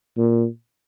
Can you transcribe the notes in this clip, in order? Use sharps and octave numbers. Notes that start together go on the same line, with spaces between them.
A#2